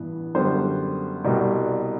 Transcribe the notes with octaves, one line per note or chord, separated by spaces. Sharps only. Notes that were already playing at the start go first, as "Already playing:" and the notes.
Already playing: A1 G2 E3 B3
F#2 D3 G3 B3 C5
C2 B2 G3 B3